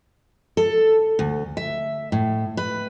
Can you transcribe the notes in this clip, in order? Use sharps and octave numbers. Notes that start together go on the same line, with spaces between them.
A4
D2
E5
A2
B4